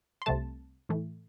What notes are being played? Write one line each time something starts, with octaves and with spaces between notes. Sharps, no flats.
C6
C2 C3 A3 A5
A2 E3 A3